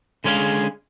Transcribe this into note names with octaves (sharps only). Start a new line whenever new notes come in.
D3 G#3 C#4 G#4 F5